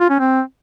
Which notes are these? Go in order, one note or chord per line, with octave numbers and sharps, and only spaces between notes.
F4
C#4
C4